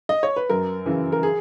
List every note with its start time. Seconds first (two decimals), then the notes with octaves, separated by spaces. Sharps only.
0.09 D#5
0.23 C#5
0.36 B4
0.50 F#2 A#4
0.86 C#3 E3
1.12 A#4
1.23 G#4